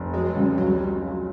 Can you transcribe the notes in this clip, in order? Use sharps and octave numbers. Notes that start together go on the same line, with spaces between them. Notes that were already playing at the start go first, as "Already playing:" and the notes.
Already playing: F1
F#3 G#3
C#3 G3
C#2 F#3
G3